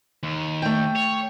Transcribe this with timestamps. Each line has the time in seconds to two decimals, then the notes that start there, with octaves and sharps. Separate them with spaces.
0.23 D#2
0.62 A3 G5
0.96 C#5